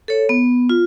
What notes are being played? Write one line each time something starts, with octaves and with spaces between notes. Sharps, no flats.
A4 C#5
B3
F4